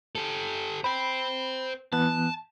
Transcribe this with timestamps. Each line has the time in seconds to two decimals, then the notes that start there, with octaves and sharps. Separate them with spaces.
0.15 G4 A4
0.84 C5 G5 B5
1.93 E3 B3 A5 F#6